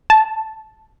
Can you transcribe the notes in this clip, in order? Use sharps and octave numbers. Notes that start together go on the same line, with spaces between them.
A5